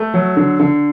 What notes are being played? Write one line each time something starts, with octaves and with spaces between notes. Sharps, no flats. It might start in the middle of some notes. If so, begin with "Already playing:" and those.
Already playing: A3
F#3
D3
D3